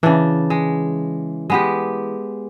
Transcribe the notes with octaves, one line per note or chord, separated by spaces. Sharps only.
C#3 E3 D4
G#3
G#3 B3 G4